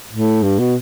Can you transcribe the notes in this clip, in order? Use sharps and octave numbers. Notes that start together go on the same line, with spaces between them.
A2
G2
B2